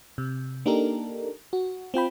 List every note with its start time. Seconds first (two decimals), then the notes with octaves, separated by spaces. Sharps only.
0.18 C3
0.66 A#3 D4 D#4 G4 A4 A#4
1.53 F#4
1.94 C4 F4 G5 B5